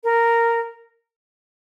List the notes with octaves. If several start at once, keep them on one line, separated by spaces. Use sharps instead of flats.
A#4